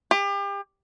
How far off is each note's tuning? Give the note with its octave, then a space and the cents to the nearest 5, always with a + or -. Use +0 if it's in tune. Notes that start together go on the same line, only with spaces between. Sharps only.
G4 +35